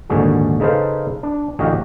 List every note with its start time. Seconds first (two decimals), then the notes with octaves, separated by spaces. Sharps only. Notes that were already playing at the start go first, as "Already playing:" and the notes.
0.10 A#1 D#2 G#2 D3 F#4 G#4
0.60 C#3 D#4 A4 B4 C5 F5
1.23 D4
1.59 A1 D3 F#4 G4 D#5 F5